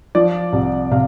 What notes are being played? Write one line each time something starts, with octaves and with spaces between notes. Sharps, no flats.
F3 D5
C2
C3 F5